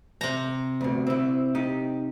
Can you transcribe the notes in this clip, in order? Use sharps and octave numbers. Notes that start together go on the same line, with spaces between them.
C3 A#5
D2 B2
C4 E4
D#4 G4